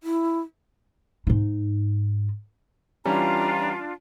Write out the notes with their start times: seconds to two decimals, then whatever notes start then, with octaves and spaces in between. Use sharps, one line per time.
0.03 E4
1.27 G#2 D#4
3.05 E3 G3 C#4 D4 F4 A#5